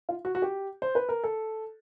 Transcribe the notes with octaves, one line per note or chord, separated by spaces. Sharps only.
F4
F#4
F#4
G4
C5
B4
A#4
A4